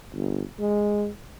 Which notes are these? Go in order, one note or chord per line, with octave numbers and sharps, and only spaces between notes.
G1
G#3